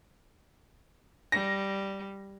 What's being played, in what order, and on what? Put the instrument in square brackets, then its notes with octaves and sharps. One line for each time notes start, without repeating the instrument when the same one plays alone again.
[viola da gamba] G3 [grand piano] A#6